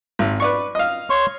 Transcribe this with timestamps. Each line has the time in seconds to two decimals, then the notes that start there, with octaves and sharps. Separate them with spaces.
0.19 G#1
0.40 B4 D5 C#6
0.75 D#5 F5
1.10 C#5 C6 C#6